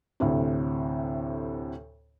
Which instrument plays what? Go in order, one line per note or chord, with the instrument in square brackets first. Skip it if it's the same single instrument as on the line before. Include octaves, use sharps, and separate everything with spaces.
[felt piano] D2 A2 C3